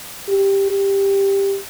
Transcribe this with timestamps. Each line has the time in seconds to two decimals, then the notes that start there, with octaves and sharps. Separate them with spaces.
0.29 G4
0.70 G4